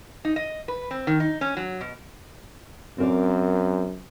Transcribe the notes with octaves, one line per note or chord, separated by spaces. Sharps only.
D#4
D#5
B4
C4
D#3
D#4
C#4
F#3
B2
F#2 C4 A#4 D5